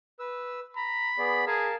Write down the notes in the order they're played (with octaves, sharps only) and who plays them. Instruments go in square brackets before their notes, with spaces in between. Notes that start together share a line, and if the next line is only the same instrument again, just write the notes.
[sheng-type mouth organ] B4 E6
[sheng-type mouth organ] A#5 [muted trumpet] B5
[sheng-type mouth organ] B3 G#4 D5
[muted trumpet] G#4 [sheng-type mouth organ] A#4 F5 A5